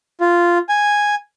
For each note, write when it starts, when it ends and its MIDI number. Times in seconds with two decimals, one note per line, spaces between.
0.21 0.58 65
0.69 1.15 80